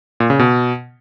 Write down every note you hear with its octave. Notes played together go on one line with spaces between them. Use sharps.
A#2
C#3
B2